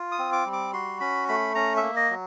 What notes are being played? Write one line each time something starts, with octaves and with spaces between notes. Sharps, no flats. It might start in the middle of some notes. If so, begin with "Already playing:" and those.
Already playing: F4
D#6
C4
D6
G3
D6
F#4 C6
C#4 B5
A3 B5
C#4 A#5
E5
A#3
D#5
F#3